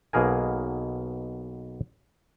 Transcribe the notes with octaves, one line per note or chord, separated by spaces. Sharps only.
B1 B2 A#3 G#4 A#4 G#5